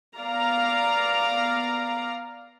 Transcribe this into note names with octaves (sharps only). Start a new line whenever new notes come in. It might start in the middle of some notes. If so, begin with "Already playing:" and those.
B3 D5 F5 A#5